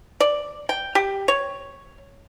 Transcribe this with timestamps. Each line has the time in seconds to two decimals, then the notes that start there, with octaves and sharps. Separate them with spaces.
0.20 D5
0.69 G5
0.95 G4
1.28 C#5